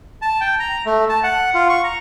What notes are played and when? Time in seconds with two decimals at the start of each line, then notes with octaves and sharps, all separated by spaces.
0.22 A5
0.41 G5
0.60 A#5
0.86 A3
1.09 A5
1.23 F#5
1.54 F4
1.69 C#6
1.84 A#5